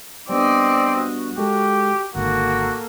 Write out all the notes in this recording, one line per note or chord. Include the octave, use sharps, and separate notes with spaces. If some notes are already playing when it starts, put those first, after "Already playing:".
G3 B3 C4 D4 D5 D#5
F#4
G#3 G4 A4
G#1 G#2 D3 A#3 F#4 A4